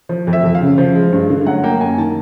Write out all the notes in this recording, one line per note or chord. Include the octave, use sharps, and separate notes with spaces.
F3
F2
E5
F2
F5
C#3
F3
G#3
G2
D3
F#3 F#5
A#3 G5
F#2 G#5
D#3 A5